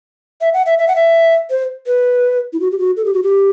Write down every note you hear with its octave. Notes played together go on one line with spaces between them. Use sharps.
E5
F#5
E5
E5
F#5
E5
C5
B4
E4
F#4
G4
F#4
A4
G4
F#4
G4